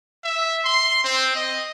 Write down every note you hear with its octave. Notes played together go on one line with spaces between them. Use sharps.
E5
C6
C4
D#5